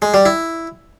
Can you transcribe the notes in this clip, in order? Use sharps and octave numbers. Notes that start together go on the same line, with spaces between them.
G#3
G3
E4